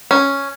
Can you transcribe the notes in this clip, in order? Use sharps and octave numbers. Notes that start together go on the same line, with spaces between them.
C#4